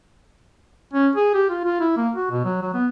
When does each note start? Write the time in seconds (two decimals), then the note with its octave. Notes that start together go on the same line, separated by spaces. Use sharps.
0.94 C#4
1.16 G#4
1.34 G4
1.50 F4
1.64 F4
1.81 E4
1.97 A#3
2.16 F#4
2.31 B2
2.45 F#3
2.62 F#3
2.74 B3